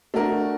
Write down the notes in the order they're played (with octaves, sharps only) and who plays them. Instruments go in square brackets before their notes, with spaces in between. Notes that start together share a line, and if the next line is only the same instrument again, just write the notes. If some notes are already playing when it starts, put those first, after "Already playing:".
[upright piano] A3 D4 F#4 A#4